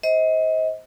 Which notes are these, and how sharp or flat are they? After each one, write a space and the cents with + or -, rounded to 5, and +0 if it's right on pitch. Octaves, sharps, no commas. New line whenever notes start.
C5 +0 D#5 +35